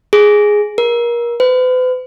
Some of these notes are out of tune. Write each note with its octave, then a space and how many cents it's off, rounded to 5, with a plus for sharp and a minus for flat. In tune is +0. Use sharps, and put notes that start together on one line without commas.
G#4 +0
A#4 +30
B4 +45